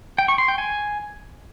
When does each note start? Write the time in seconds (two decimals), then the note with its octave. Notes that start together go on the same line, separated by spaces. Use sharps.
0.18 G5
0.28 C#6
0.38 C6
0.48 G5
0.58 G#5